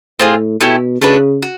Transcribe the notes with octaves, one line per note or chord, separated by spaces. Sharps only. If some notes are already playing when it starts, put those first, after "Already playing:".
A2 C4 F4 G#4
B2 A3 C#4 E4 G4
C#3 A3 D4 F#4 B4
F#4